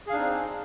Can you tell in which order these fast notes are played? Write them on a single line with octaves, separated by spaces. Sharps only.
G#4 F5 D4 D#4 C4